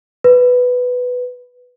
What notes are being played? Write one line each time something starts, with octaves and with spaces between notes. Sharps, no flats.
B4